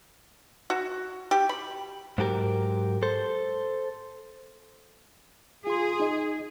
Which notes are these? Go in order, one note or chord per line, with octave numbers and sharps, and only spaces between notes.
F#4
G4
B5
G#2 F#3 G4 A4 A#4
A4 C5
F4 G#4 C6
D#4 D#5